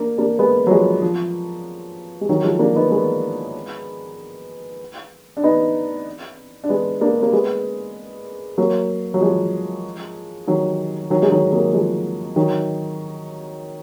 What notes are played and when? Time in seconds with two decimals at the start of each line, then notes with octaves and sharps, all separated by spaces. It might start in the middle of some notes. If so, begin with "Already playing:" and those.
Already playing: A#3 D4
0.18 A#3 D4
0.39 G#3 B3
0.67 F#3
0.71 F3 G#3
1.02 F3
2.21 G#3
2.29 D#3 F#3
2.44 F3 G#3
2.59 A#3 D4
2.75 B3 D#4
2.91 G#3 B3
5.37 D4
5.44 B3 D#4
6.64 D4
6.69 G#3 B3
7.01 A#3 D4
7.23 A#3
7.32 G#3 B3
8.58 F#3 A#3
9.14 F#3
9.21 F3 G#3
10.47 D#3 F#3
11.10 D#3 F#3
11.22 G#3
11.31 D#3 F#3
11.52 F#3 A#3
11.73 F3 G#3
12.36 D#3 F#3